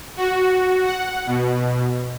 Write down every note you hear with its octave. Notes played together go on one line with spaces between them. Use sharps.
F#4
F#5
B2